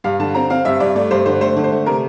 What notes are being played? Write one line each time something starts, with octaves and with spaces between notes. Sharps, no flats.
G2 F5
D3 A5
C4 A#5
C4 F5
G2 E5
G2 D5
A3 D5
G2 C5
D3 C5
A3 C5
D3
C5
A3
C3 A#4